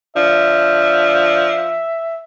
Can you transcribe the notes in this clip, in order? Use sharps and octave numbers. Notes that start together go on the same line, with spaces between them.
F3 D4 E5